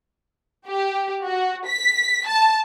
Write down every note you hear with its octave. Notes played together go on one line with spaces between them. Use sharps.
G4
F#4
B6
A5